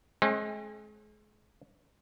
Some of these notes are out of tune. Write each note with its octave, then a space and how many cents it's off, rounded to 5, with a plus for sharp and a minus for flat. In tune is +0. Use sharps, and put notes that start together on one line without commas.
G#3 +35 C#4 -45